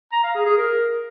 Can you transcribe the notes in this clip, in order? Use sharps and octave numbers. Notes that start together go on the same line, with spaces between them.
A#5
F5
G#4
G#4
A#4